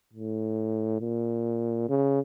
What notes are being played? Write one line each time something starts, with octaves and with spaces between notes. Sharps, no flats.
A2
A#2
C#3